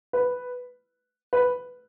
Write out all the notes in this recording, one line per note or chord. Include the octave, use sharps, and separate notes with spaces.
B4
B4